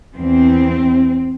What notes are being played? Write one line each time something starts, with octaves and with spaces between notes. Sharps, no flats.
E2 E3 C4